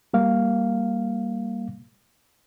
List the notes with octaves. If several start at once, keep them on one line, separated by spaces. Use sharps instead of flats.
G3 A#3 F5